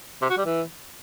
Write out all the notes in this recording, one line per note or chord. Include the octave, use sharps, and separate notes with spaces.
C3
F#4
G3
E3